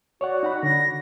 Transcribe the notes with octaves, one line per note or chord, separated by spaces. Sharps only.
F#4 C#5 D5 F#5
D#4 F#5 B5
D3 A#6